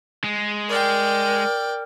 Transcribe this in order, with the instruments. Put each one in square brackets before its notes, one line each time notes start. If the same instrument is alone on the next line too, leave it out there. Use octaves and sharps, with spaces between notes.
[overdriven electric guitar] G#3
[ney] A#4 [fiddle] D5 G5